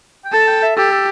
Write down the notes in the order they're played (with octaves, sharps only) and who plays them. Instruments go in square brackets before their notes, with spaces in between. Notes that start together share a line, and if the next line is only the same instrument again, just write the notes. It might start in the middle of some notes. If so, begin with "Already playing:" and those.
[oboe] G5
[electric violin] A4 [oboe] A5
[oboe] G5
E5
[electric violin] G4 [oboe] A4
[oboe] A4